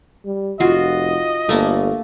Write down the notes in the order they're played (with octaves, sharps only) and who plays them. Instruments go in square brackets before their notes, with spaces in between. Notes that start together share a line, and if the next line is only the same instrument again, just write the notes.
[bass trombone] G3
[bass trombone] F1 [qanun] F4 F#4 [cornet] D#5
[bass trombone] G1 [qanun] A3 A#3